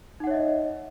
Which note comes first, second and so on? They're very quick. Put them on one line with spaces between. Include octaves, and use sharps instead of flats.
D#4 F#5 C#5 E5 D#5